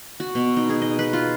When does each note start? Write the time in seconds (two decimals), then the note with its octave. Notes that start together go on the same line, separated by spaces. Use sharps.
0.20 F#4
0.35 B2
0.57 D#4
0.69 G#4
0.82 D#5
0.99 B4
1.13 F4